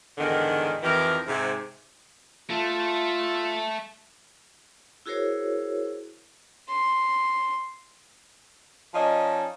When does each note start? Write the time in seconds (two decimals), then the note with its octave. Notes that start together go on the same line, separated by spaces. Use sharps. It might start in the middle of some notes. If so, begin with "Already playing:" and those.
0.18 E2 G#2 D3 D#3
0.83 F2 D#3 E3 G4 A#4
1.27 G#2 C3
2.50 A3 F4
5.06 E4 F#4 G#4 A#4 C5 C#5
6.69 C6
8.94 F3 C#4 D#4 D5 D#5